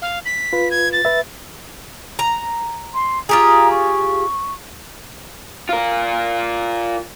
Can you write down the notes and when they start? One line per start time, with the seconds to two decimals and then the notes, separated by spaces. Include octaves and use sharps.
0.02 F5
0.25 B6
0.53 F4 B4
0.71 G#6
0.93 A6
1.05 B4 E5
2.19 A#5
2.95 C6
3.29 F4 G4 G#4 A#5 D#6
3.70 C#6
5.69 F4 A#4